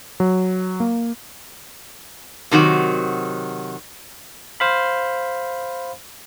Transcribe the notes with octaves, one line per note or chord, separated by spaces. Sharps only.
F#3
A#3
C3 D#3 F#3 F#4
C5 F5 B5